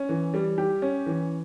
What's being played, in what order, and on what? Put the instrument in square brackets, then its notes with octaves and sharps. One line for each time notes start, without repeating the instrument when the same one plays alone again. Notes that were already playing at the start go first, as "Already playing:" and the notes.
Already playing: [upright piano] C#4
E3
G3
G4
C#4
E3